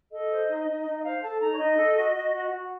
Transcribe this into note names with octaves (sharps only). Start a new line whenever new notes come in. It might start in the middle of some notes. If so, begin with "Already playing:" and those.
A4 D#5
C5
D#4
D#4
D#4
D#5
C5 F5
A4 A5
D#4 A#5
C#5
D#4 D#5
A4
F#4
F#4
F#4
F#4